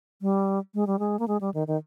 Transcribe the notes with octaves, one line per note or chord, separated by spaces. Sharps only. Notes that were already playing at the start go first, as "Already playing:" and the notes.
G3
G#3
G3
G#3
A#3
G#3
G3
D#3
D#3